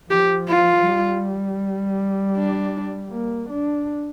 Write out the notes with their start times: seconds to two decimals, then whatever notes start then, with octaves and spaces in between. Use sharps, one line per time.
0.10 F3 G4
0.48 F4
0.86 G3
2.37 D4
3.11 A#3
3.49 D4